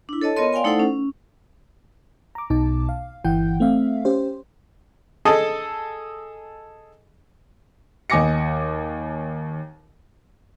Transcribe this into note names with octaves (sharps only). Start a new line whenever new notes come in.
D4 E4
A4 C#5 D#5 A5
B3 F4 A#4 C#5 D#5 C6
D5 F5 G5 G#5 C6
A3 D#4 E4 A4 C5 F#5
C#4
A#5 D6
B1 B2 D#4 A5 D6
F5
G1 E3 E4 F#5 G5 G6
A3 C4 E5 F5
C#4 G4 C5
G#4 A4 D#5 G#5 A5
D#2 D#5 G#5 D6 A#6 C#7